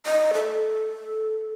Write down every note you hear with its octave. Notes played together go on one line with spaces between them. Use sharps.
D#5
A4